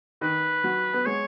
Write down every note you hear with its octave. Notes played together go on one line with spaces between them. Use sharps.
D#3 B4
F#3
B3
G#3 C#5